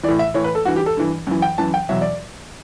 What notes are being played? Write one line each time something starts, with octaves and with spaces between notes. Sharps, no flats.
E3 D5
A2
E5
A2 E3 C#5
B4
A4
G2 E3 F#4
G4
A4
G2 E3
F#2 E3
G5
F#2 E3 A5
G5
E2 B2 F#3 E5
D5